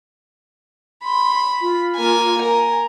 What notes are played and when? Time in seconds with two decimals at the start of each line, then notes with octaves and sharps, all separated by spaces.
1.04 B5 C6
1.62 F4
1.96 A#3 G#5
2.42 A#4 G#5